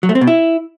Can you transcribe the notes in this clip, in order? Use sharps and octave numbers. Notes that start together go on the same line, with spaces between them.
F#3
A3
C4
B2
E4